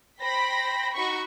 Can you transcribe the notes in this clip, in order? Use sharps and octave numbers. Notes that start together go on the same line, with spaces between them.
C5 G5 B5 A#6 B6
D#4 F#4 B5 C#6